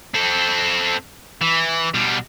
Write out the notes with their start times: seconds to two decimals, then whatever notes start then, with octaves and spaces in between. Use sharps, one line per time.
0.14 C4 A4
1.41 E3
1.94 B2 G3